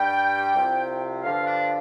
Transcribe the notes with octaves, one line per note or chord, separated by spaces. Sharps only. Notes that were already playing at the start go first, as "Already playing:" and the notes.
Already playing: G2 G3 G5
C2 C3 F3
G2 D3 F3 F5
D4